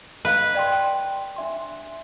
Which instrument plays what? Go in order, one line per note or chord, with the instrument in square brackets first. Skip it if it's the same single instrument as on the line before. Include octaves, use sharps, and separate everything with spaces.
[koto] B4 [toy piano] D#5 F5 A#5
[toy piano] D5 G5 C6
G5
D4 E5 C6